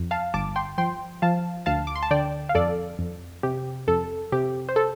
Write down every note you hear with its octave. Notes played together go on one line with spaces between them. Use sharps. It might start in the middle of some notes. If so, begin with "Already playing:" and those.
Already playing: F2
F5 A5
G1 A5 D6
G5 C6
F3 G5 C6
F3 F5 A5
D2 F5 A5
D6
C6
A5
D3 D5 G5
F5
F2 A4 D5
F2
C3 G4
F2 A4
C3 G4
C5
A4